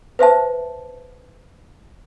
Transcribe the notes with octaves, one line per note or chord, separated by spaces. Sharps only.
B4 C5 E5 A5